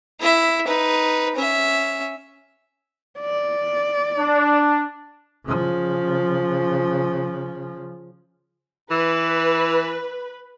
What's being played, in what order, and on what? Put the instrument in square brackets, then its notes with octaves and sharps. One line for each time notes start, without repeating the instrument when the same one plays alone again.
[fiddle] E4 E5
D#4 B4
C#4 E5
[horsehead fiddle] D5
[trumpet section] D4
[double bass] C#3 F3
[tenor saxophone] E3 [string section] B4